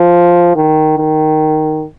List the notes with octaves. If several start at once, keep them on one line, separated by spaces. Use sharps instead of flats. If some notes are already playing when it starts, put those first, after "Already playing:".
Already playing: F3
D#3
D#3